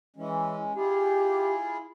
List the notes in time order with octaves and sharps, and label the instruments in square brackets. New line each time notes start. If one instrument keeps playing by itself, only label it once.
[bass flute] E3 [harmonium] G#3 C#4
[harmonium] E4 F4 G#4 [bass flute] G4